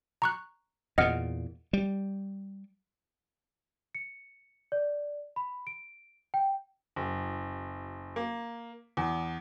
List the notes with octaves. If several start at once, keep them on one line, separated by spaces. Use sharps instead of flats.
A#5 C#6 F#6
E2 A#2 D#5 F#5 F6
G3
C#7
D5
B5
D7
G5
F#1
A#3
E2